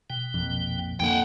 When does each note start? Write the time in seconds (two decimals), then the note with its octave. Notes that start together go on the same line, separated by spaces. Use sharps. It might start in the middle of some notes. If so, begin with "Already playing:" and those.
0.10 B2 G5
0.34 A#1 F2
1.00 F2 A#2 D3 F#5 G5